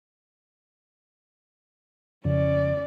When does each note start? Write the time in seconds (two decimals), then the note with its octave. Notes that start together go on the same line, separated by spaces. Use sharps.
2.25 F2 C#3 C#4 D5